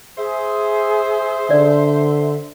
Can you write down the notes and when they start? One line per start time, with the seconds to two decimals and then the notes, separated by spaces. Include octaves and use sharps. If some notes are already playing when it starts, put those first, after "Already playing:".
0.18 G#4 C5 E5
1.50 D3 D5